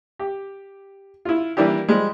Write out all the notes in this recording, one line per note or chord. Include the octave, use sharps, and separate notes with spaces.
G4
E4 F4
E3 G3 A#3 D4 E4 G4
F3 G3 G#3